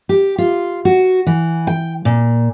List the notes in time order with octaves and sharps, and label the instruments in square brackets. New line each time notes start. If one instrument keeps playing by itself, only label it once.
[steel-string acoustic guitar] G4
F4
F#4
E3
G5
A#2